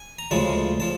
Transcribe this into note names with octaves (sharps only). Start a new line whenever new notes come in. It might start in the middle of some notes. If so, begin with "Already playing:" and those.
Already playing: G#5
A#5
D2 C#3 F3 G#3 A5
F3 A5